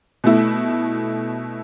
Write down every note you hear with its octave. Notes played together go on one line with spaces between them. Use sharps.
B2 A3 E4